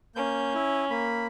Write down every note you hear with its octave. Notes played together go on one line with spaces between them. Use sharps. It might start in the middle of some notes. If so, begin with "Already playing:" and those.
A#3 C#4 G6
E4
A#3 B5